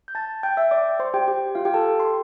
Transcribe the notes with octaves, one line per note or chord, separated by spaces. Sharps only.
G6
A5 A6
G5 G6
E5 E6
D5 D6
C5 C6
G4 G5
G4 G5
F4 F5
G4 G5
A4 A5
C6